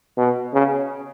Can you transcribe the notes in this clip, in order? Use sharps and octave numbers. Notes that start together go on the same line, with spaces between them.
B2
C#3